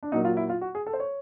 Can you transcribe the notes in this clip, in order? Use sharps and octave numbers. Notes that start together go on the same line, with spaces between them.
D4
A#2 F#3 A#3 D#4
F4
E4
F4
F#4
G#4
A4
C5
C#5